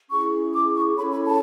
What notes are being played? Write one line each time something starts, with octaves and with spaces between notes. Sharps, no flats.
C#4 E4 G#4 C#6
D6
C#6
C#4 E4 A4 C#5 B5
B5
A5